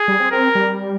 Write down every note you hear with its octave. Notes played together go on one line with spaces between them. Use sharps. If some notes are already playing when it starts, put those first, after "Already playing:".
Already playing: G#4
G3
C4
C4 A#4
G3